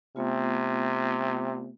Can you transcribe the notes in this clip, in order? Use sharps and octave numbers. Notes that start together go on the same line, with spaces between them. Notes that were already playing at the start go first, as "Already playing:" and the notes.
C3 A3 B3 F4